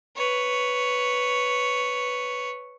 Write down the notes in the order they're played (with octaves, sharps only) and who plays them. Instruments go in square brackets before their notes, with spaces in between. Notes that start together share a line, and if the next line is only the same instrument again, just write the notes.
[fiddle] B4 C#5